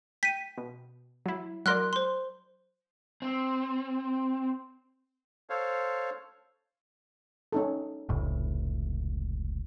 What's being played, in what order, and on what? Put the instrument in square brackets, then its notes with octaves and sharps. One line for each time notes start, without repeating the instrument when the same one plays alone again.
[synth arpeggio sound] G5 [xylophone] B6 D#7
[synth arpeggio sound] B2
F#3 E4
[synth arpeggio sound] F#3 A#4 D5 [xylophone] C6 F6 F#6
[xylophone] C5 C6
[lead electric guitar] C4
[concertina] A4 C5 C#5 F5
[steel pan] C#4 D#4 A4
[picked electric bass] F1 C#2 A2